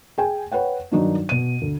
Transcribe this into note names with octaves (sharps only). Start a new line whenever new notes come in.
G#4 G5 G#5
B4 C#5 F#5 G5
G2 D#3 F#3 D4 D#4
B2 D#7
D2